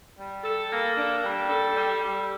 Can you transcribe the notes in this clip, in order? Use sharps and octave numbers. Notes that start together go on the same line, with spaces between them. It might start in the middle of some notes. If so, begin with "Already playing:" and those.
G3
A4
A#3
D4
G3
A4
G3
G3